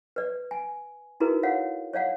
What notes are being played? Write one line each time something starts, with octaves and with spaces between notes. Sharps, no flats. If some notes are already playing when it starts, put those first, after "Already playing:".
B4 D5
G#5
D#4 E4 F#4 G#4 A#4 B4
C#5 F5 F#5
C#5 D5 F5 F#5